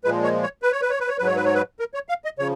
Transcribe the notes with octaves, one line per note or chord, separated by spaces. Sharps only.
A#2 F3 G#3 B4
C#5
C#5
B4
C#5
B4
C#5
B4
C#5
G#2 F#3 B4
C#5
B4
C#5
B4
A#4
C#5
F5
D#5
C#3 F3 C#5